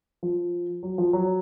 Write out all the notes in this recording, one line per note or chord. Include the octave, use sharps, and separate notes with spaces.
F3
F#3
F3
F#3